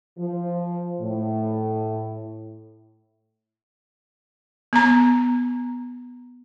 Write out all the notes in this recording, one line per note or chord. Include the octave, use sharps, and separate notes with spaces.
F3
A2
B3 A#5